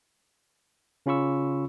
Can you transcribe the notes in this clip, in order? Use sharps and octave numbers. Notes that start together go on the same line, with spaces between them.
C#3 C#4 F4 B5 C#6 E6